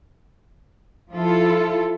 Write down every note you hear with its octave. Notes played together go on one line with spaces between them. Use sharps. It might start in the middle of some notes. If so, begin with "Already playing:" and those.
F3 E4 F4 A4